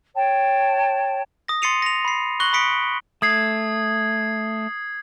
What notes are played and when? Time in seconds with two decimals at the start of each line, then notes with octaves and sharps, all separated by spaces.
0.15 C#5 G5 A5
1.48 D#6 A#6
1.62 C6 A6 C7 C#7 D#7 F7
1.82 A#6 F7
2.05 B5 C7
2.40 C#6 F#6 A#6 F#7 G7
2.53 B5 D#6 B6 C#7 D7
3.22 A3 D#6 G#6 C7